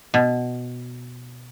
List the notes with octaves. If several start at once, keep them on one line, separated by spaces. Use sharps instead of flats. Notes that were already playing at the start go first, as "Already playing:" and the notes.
B2